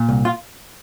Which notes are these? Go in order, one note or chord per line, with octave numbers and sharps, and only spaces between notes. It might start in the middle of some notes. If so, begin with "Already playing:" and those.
Already playing: A#2
C2
F4